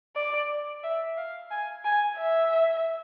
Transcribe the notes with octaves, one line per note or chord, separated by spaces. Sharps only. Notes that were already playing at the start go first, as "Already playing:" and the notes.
D5
E5
F5
G#5
G#5
E5